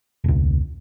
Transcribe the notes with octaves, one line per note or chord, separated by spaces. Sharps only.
E1 C#2